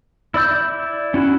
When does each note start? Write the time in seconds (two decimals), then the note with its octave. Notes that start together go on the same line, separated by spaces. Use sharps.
0.34 E4 D5 E6 G6
1.14 C#4 E4 F#4